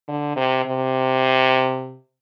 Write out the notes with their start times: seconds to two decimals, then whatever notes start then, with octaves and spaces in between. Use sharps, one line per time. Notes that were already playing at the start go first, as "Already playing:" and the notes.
0.08 D3
0.36 C3
0.65 C3